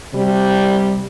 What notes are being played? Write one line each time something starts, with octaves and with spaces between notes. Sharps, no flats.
C3 G3